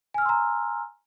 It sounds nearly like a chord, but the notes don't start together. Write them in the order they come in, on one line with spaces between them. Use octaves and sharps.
G#5 F6 E6 C6 A#5